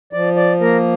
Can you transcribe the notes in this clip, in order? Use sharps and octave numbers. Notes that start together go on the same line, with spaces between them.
F3 D5
D5
A#3 A#4